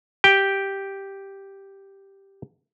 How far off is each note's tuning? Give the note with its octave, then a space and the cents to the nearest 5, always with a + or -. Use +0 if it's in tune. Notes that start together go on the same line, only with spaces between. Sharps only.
G4 +0 G5 +0